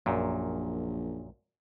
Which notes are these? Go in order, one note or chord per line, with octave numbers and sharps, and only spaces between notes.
A#1 F#2 A#2